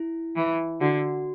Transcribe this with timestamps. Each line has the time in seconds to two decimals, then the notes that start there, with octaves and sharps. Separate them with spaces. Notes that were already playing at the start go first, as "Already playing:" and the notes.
Already playing: E4
0.36 E3
0.81 D3 F#4